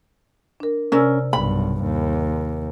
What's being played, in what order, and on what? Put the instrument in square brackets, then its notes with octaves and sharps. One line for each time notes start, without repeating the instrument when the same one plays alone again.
[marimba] D4 A#4
[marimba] C3 D5 E6 [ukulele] C#4 A#4
[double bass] B1 G2 [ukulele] B5
[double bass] D#2